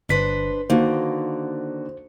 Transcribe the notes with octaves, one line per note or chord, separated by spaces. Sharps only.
G1 D4 B4 C5 B6
D3 D#3 A#3 F#4 C5